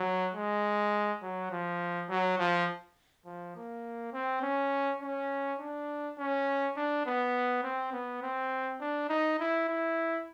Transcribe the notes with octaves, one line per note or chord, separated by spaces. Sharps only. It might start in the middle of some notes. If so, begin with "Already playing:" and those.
Already playing: F#3
G#3
F#3
F3
F#3
F3
F3
A#3
C4
C#4
C#4
D4
C#4
D4
B3
C4
B3
C4
D4
D#4
E4
E4